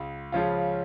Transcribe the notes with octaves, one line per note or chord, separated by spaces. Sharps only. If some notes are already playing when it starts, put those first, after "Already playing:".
Already playing: C#2
C#3 F3 C#4 F4